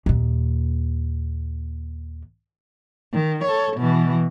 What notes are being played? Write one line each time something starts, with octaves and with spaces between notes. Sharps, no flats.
D#2 A#2
D#3
A4 C#5
B2 E3